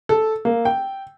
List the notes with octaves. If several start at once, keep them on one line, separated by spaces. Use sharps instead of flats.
A4
A#3
G5